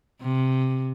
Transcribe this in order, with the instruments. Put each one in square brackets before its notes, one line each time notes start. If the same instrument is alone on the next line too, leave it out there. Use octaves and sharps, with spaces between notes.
[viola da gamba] C3